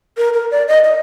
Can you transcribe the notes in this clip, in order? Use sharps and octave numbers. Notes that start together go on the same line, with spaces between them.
A#4
A#4
D5
D#5
D#5